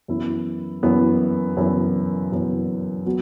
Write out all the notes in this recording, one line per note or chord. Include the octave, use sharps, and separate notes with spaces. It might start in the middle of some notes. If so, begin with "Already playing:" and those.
F#2 E3 B3 E4
F#2 E3 B3 E4
F#2 E3 B3 E4
F#2 E3 B3 E4
F#3 B3 F#4